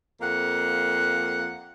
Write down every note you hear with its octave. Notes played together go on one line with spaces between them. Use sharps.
F2 A#3 F#5